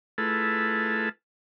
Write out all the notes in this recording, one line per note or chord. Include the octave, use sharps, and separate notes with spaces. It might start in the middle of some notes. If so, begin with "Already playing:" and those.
A3 E4 F4 G#4 A4 B4